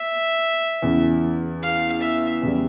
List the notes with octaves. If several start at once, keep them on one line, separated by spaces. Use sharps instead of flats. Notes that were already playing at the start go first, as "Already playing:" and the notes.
Already playing: E5
E2 C#3 E3
F5
E5
E2 C#3 E3 G3